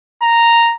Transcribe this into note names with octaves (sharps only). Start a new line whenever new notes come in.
A#5